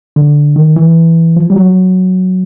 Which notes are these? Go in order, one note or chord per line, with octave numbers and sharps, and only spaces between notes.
D3
D#3
E3
F3
G3
F#3